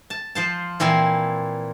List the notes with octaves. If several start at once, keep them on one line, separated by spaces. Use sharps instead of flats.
A5
F3 C5 A5
A#2 E3 C4 G#5 C6